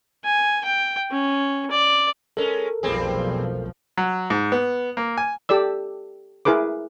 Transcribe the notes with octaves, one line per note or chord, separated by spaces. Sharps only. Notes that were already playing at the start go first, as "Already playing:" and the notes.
G#5
G5
C#4
D5
G#3 C#4 A4 A#4
F1 B1 F3 G3 C4 G#4
F#3
G#2
B3
A#3
G#5
G4 A4 D5 E6
E4 G#4 A#4 B4 D6